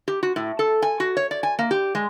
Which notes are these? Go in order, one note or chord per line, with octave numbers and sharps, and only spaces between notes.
G4
F#4
A2
A4
G#5
F#4
C#5
D5
G#5
A#3
G4
G#3